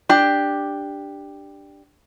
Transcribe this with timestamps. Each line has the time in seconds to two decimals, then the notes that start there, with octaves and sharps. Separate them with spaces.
0.09 D4 G4